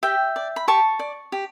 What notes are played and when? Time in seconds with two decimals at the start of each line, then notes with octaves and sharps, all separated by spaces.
0.03 G4 E5 G5
0.36 D5
0.56 B5
0.68 G4 A5 C#6
0.99 D5
1.32 G4